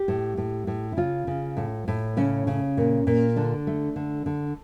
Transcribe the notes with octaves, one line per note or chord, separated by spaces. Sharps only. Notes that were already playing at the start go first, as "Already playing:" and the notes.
Already playing: G4
A2
A2
A2
E4
C#3 F4
C#3
A2
A2
C#3 C#4
C#3
A#2
A#2
D3 D4
A3
D3
D3